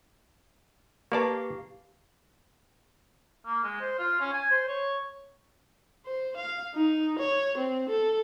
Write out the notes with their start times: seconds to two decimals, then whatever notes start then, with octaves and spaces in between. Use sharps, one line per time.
1.12 A#3 G4 B4 D5 F5 A5 A#5 C#6
3.46 A#3
3.63 G#3
3.80 C5
3.99 F4
4.20 C#4
4.33 G#5
4.51 C5
4.68 C#5
6.06 C5
6.37 F5
6.75 D#4
7.19 C#5
7.58 C4
7.90 A4